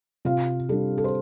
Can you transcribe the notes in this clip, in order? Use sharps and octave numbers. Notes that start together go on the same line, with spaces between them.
C3 F4 F5
G3 D4 A4
A4
C5